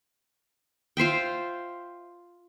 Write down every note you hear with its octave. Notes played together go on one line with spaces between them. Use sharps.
F4 C5 E5 G5